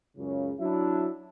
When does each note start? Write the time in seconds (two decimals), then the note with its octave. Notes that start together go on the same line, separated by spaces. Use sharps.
0.17 C#2 F#2 C#3
0.59 F#3 D4 E4